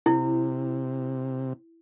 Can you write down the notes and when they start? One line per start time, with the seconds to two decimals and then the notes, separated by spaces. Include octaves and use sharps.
0.06 C3 E4